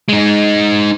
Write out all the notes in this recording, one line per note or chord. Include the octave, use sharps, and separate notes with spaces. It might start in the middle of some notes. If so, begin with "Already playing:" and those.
G#3 D#4